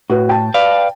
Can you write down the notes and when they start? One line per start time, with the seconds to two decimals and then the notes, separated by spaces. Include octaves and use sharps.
0.10 A2 F#4 B4
0.29 G5 A5
0.54 B4 D5 F5